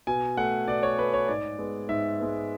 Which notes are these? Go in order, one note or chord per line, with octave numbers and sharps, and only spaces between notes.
B2 G#5
A3 F#5
B2 D5
C#5
A3 B4
C#5
G#2 D5
G#3 B3
G#2 E5
G#3 B3